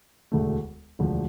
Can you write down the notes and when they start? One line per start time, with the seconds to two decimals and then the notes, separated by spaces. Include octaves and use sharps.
0.32 E1 D2 D3 A3
0.99 E1 D2 D3 F3